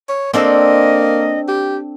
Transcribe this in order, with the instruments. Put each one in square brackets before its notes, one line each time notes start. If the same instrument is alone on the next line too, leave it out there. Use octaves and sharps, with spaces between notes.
[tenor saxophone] C#5
[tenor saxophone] A#3 [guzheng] C4 D4 A4 [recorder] D#5
[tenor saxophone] G4